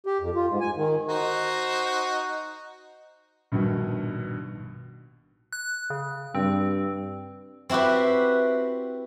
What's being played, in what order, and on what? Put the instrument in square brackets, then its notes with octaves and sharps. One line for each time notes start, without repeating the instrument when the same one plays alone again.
[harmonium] G4
F2
F4
G#2
G#5
D#3
[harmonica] D#4 F#4 C5
[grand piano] A#1 G2 B2 D#3
[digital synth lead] F#6
C#3
[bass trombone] G2 [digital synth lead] C4
[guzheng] C4 E4 F#4 G4 B4